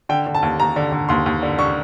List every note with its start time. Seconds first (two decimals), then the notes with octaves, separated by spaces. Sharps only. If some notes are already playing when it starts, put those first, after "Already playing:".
0.09 D3 G5
0.26 D3
0.35 A5
0.43 D#2
0.60 D#2 A#5
0.76 D3
0.92 D3
1.09 D#2 C6
1.26 D#2
1.43 D3
1.59 D3 C#6